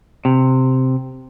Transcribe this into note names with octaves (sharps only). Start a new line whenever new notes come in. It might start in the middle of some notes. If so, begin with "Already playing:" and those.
C3